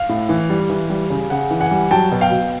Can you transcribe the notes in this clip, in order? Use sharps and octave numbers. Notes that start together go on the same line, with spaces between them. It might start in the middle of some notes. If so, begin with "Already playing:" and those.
Already playing: F5
A2
E3
G3
E3
G3
C#3
C#3 F#5
E3
F#5 G#5
G3
F#3 G5 A5
B2
F5 G5
B2